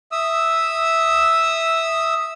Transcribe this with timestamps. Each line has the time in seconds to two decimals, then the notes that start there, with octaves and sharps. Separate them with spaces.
0.12 E5 D#6 E6